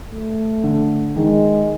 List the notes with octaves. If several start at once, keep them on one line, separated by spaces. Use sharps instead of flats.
A3
D3
D#3 G#3